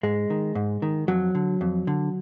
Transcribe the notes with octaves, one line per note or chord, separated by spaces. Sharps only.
G#2 G#3
D#3
G#2
D#3
F2 F#3
D3
F2
D3